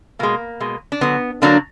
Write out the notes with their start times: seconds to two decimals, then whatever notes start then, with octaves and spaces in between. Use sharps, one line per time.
0.19 B2 G#3 A#3
0.60 B2 G#3
0.92 D4
1.01 D3 F#3 B3
1.42 D3 F#3 A#3 D4